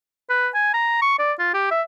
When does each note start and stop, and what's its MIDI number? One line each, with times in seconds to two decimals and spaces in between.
0.30 0.48 71
0.55 0.73 80
0.74 1.00 82
1.02 1.16 85
1.19 1.32 74
1.39 1.51 65
1.54 1.68 67
1.71 1.82 76